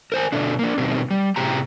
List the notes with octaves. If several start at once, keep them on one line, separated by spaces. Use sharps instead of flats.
A#4 C5 G#5
B2 D3 A3 D4
A#3 D4
B2 D#3 G3 C4
G3
A2 C3 G4 G#4 A#5